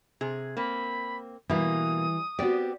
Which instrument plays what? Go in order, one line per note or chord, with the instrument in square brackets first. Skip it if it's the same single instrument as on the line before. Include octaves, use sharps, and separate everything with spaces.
[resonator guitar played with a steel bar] C3 G#4
[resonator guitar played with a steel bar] A#3 C4 [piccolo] B5
[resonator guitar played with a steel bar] B2 A#3 [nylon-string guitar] E3 G3 E4 [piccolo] D#6
[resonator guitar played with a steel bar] B3 C4 G4 [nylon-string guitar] F#4 D5